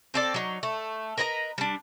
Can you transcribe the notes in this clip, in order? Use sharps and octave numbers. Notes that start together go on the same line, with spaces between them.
C4 A4 D5
F#3 D#4
A3
A#4 B4 D#5 A#5
G3 D4